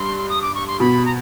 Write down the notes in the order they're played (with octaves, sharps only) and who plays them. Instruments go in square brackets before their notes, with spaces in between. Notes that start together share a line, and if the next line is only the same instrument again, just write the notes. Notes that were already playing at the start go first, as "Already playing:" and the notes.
Already playing: [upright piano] G2 [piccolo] C6
[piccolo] D#6
D6
C#6
C6
[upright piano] B2 [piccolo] B5
[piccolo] A#5